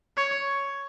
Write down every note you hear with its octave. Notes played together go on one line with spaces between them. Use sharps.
C#5